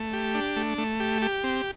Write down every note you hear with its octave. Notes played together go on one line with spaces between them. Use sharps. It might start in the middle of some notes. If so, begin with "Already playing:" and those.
Already playing: A3
G4
D4
A3
A3
G4
G4
C4